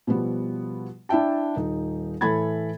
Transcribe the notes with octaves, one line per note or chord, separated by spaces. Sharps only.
B2 F3 G3 B3
D4 E4 E5 G5 A5
D#1 D#4
A2 E3 A4 B5 G#6 A6